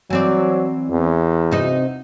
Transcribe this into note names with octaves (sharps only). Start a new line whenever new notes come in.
E3 F#3 C4 D5
E2
C3 D#4 F#4